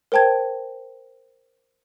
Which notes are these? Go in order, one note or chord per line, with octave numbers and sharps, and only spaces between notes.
A#4 C5 G5 A5 G#6